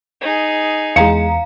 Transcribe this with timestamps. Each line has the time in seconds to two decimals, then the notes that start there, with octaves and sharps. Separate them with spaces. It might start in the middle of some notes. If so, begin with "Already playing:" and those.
0.21 D#4 G#4
0.96 E2 G#3 F5 A#5 C#7